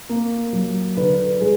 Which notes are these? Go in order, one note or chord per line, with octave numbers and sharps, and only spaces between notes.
A#3
F#3
D3 B4
G#3